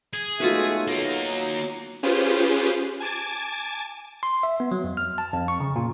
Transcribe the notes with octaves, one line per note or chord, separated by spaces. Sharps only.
G#4
B1 G#3 A3 F4 F#4 B4 E5
F#3 A#3 D#4
C#4 F4 G4 G#4 B4 C5
G#5 A5 D6 A6
C6
E5
B3
F#3
F2
F6
A5
F2
C#6
C#3
A#2